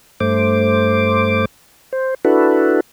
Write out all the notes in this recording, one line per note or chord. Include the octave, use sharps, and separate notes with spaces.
G2 A3 C5 D6
C5
D4 E4 F#4 A4 B4